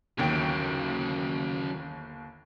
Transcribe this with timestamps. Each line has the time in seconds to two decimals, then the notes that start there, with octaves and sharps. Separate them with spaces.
0.18 G1 D#2 C#3 F#3 G5